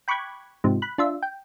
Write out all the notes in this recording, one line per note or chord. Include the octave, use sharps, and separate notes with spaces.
G5 B5 C#6 D6 F#6 G#6
G#2 C3 F3
B5 F#6
D4 F4 E5
G5